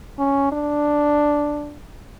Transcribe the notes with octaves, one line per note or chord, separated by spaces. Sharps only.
C#4
D4